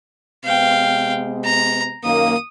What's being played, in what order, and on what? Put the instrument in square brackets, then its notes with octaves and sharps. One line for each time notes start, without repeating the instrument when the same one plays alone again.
[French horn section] C3 G#3 B3 [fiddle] F5 G5
[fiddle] A#5
[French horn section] F#2 D#3 A#3 [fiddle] D#6